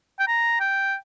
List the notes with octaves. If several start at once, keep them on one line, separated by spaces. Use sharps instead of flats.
G5
A#5
G5